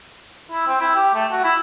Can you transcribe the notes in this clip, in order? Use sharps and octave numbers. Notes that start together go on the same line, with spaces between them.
E4
C4
E4
G4
A3
F#4
E4